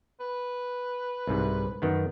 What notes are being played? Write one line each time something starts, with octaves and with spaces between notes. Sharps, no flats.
B4
C2 G#2 C3
F#2 D#3 B3